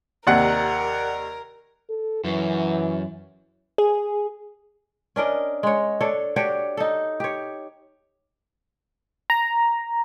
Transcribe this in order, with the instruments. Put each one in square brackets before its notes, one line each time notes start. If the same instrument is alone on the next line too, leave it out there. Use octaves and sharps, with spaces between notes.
[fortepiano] D#2 C3 [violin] A#4 [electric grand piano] D5 F#5
[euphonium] A4
[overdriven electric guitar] F#2 [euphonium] E3
[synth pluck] G#4
[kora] C#4 D4 A#4 D#5
G#3 C#5
D4 A4 C#5
D4 F#4 G4 C#5
D#4 A4
G4 C#5
[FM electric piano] A#5